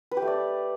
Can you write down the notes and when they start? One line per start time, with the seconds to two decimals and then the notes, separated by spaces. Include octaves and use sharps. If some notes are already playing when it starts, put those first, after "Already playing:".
0.11 B4
0.17 G4
0.22 A3
0.27 D5